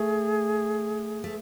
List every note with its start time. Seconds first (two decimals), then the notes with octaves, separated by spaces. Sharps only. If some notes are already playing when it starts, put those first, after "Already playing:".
Already playing: A3 G#4
1.24 A3